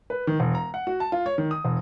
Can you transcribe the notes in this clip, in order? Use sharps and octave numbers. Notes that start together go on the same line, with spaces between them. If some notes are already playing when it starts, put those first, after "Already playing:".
B4
D#3
E1
A#5
F#5
F#4
A5
F4
C#5
D#3
D#6
E1